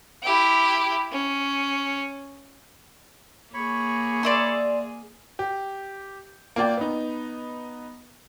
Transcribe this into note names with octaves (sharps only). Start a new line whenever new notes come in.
E4 G4
C#4
A#3 G#4 C#5 B5 C#6
D5 E5 C6
G4
A#3 F4 D5 G5
B3 D#4